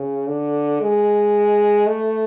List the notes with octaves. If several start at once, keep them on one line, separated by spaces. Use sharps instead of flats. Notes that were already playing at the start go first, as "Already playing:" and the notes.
Already playing: C#3
D3
G#3
A3